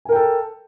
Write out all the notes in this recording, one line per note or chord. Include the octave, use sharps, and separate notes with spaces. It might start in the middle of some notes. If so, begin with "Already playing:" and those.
A4 A#4 G5 G#5